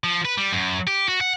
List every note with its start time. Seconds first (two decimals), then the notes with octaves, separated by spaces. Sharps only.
0.04 F3
0.25 B4
0.37 G3
0.53 F#2
0.87 G4
1.08 F#4
1.21 F#5